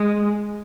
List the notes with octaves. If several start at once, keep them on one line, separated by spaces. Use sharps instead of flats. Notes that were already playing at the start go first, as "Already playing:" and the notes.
Already playing: G#3